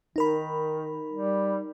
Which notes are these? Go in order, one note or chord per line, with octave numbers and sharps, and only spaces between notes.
D#3 D#4 A#4 B5
G3